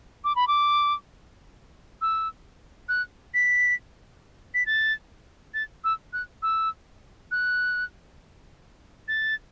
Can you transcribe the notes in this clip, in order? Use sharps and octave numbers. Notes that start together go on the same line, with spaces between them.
D6
B5
D6
E6
F#6
B6
B6
A6
A6
E6
F#6
E6
F#6
A6